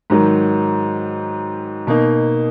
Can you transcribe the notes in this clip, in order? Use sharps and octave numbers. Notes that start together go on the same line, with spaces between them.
G#2 D#3 F#3
B2 A#3 D#4